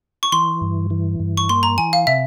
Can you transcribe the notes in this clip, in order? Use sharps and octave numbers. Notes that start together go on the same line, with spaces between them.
C#6
E3 C6
G2
E3
G2
C#6
A#3 C6
A#5
E3 G#5
F5
C3 E5